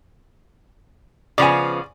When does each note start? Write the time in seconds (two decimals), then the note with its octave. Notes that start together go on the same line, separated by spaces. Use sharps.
1.38 C#3 F3 B3 D5 G#5